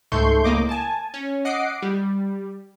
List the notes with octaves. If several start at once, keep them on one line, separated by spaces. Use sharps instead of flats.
C#2 G#2 A3 C6 C#6 G6
C#2 A2 A#3 D#5 D6
G#5 A5
C#4
D#5 F#5 D6 D#6 C7 D7
G3